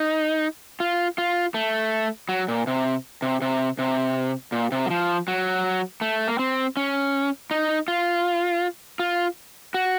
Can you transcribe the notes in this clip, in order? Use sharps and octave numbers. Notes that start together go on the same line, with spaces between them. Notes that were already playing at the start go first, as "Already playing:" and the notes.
Already playing: D#4
F4
F4
A3
F#3
A#2
C3
C3
C3
C3
A#2
C3
F#3
F3
F#3
A3
A#3
C4
C#4
D#4
F4
F4
F#4